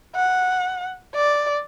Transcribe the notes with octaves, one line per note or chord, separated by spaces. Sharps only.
F#5
D5